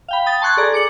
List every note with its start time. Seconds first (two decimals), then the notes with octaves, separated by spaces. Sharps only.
0.08 F5 G5 B5
0.26 G5 D#6 A6
0.41 A5 C6 C#6 F#6 G#6 A6
0.57 G#4 A4 D5 A#5
0.72 G#4 D6 C#7 F#7